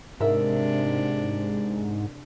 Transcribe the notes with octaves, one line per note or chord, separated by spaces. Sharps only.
G#2 C3 D4 A#4 D#5 E5